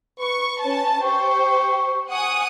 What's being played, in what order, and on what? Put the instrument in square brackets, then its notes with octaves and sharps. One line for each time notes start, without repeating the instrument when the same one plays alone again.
[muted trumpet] B4 [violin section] C#6
[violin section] C#4 A5 [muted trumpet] B4
[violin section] G4 C5 [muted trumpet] C#6
[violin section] F#5 G#5 D#6